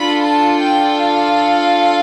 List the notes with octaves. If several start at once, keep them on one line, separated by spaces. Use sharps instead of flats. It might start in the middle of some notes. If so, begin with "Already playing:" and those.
Already playing: D4 F4 A4 B5
A5
G5
F5